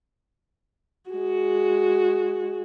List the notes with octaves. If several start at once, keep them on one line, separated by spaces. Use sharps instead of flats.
G#3 F#4